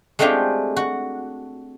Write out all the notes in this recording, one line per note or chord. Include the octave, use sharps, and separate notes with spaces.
G#3 A3 C4 D4 F4 G4
F#4